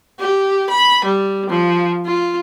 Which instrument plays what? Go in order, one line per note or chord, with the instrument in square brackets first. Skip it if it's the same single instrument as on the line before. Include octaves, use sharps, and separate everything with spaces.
[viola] G4
B5
G3
F3
F4